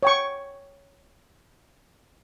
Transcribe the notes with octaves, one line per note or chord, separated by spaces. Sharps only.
C#5 G5 C#6